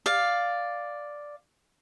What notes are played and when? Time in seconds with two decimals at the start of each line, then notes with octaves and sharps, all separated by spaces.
0.06 D5 F5